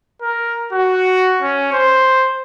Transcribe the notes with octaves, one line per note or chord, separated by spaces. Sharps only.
A#4
F#4
C#4
C5